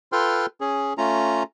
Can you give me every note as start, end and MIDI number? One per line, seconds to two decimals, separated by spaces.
0.12 0.46 65
0.12 0.46 69
0.12 0.46 71
0.12 0.46 79
0.12 0.46 84
0.12 0.46 89
0.61 0.93 61
0.61 0.93 68
0.98 1.43 57
0.98 1.43 61
0.98 1.43 65
0.98 1.43 82